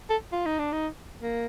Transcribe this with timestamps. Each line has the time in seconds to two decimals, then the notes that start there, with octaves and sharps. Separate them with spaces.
0.10 A4
0.32 F4
0.46 D#4
0.59 D4
0.72 D#4
1.22 A#3